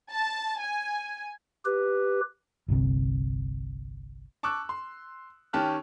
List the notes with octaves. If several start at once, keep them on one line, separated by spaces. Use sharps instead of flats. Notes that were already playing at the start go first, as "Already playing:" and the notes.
A5
G#5
G4 B4
G1 C2 C3
A5 C#6 D6 E6 F#6
C6
D#3 C#4 G4 A5 F6 F#6